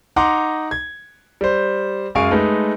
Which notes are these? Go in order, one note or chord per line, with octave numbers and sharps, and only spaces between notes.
D#4 F#5 A#5 C6 D6
G#6
G3 C5
F#2 G#3 F5 G#5 C#6 D7
G#3 A3 D#4 B4